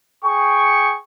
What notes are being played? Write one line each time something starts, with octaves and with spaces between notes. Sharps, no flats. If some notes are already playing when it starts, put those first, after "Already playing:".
G#4 G5 C#6